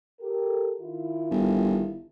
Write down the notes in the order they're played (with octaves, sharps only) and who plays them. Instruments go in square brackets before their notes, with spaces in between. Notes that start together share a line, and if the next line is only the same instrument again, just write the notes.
[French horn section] G4 A4 A#4
D#3 E4 F4
[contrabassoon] G1